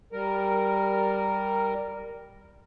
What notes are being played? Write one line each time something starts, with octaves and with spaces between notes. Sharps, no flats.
G3 A#4